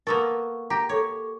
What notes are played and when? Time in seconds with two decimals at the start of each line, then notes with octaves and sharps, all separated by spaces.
0.07 A#3 B3 A4 A#4 C#6
0.70 G4 A#5 A#6
0.89 A4 C#5 C#6 D6